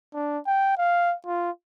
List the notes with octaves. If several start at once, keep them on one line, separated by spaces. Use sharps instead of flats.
D4
G5
F5
F4